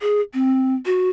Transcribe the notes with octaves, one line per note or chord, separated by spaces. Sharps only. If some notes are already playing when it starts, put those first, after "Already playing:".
G#4
C4
F#4